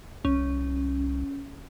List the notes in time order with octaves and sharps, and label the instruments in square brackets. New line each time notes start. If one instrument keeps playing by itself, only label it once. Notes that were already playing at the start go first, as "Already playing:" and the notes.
[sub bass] C2 [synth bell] C#4